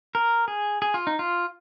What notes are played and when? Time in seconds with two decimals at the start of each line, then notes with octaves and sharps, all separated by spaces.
0.15 A#4
0.48 G#4
0.82 G#4
0.94 F4
1.07 D#4
1.19 F4